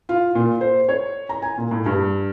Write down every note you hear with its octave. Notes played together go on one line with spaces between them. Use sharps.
F4
A#2
C5
C#5
A#5
G#5
A#2
A2
G2